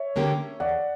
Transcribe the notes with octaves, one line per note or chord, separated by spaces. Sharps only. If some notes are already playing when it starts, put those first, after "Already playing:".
Already playing: C#5 E5
D3 A#3 C#4 G4
E2 D5 F#5